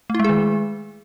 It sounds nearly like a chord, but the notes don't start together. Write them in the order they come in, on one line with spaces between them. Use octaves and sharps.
A3 E4 G#3 G#4 D#3